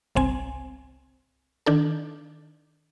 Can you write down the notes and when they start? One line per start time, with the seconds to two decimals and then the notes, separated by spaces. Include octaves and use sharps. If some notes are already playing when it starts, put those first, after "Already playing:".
0.15 G1 C2 C4 G#5
1.66 D#3 D4 A4